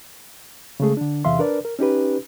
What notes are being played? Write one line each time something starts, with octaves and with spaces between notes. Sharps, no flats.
C#3 G#3 A3 G#4
D3 D4
E2 C3 E3 E5 F5 C6
D4 A#4 B4 D5
A#4
C#4 D#4 G4 B4